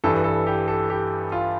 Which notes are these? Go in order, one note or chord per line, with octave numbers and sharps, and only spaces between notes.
G2 E3 G3 A4
A4
G4
A4
G4
F4